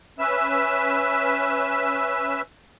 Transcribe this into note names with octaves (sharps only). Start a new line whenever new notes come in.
C#4 B4 E5 E6